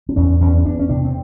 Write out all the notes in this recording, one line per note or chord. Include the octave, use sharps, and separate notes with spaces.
C4
E2 C#4
E2 C#4
C#4
E2 D4
C#4
C3 D4
C4